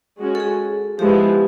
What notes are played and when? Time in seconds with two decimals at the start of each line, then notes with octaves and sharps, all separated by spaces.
0.20 G#3 C#4 F#4
0.35 A4
0.40 G#4
0.99 F3 G#3 B3 E4 G4